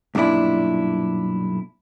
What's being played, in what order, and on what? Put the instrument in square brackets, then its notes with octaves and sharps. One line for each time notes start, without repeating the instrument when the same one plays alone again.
[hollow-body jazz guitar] B1 G2 A#2 D4 E4